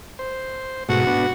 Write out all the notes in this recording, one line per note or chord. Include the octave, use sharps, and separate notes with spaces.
C5
G#2 B2 A3 F#4
B3 D4